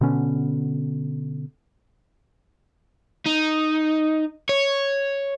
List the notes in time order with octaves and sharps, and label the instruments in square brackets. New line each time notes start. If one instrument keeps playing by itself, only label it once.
[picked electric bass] B2 D3 B3 C#4
[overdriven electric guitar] D#4
C#5